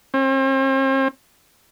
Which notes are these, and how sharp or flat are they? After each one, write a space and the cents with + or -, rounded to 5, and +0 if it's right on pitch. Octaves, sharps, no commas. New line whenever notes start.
C4 +45